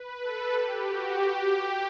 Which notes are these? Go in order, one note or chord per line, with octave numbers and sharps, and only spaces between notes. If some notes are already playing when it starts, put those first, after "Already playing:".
Already playing: B4
A4
G4
F#4
G4